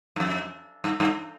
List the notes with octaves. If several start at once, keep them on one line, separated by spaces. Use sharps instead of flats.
G2
F2
G2
G2